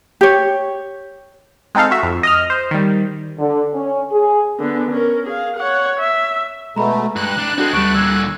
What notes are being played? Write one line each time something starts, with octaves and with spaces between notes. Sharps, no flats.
G4 C#5
G#3 C4 D#4 A4 F5
F#4 E5
F2
D#5 D#6 F6
C5
D#3 G3
D3
C#4
G#4
D3 B3
C#4 A#4
G#4 F5
C#5 F#5
E5
B2 G#3 A3 A#5 B5
G2 F#6
C2 D4
G#3 C4 D4 F#4 A4
D2 G3 A3 B3 C#6 D7
A#2 D3 E6 G#6